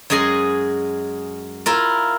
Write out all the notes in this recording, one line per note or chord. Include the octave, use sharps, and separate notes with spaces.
F#2 G#3 G#4 D#5 C6
E4 F4 A#4